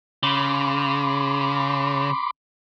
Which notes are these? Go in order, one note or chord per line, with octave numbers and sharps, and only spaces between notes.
C#3 B5 C6 D6